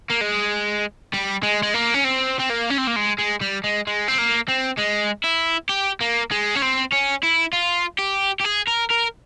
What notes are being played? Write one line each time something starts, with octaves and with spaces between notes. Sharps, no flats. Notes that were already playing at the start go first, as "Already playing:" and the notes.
A#3
G#3
G3
G#3
G#3
A#3
C#4
C4
C4
A#3
C#4
C4
A#3
G#3
G#3
G3
G#3
G#3
C4
A#3
C4
G#3
E4
G4
A#3
G#3
C#4
C4
C#4
E4
F4
G4
G4
G#4
A#4
A#4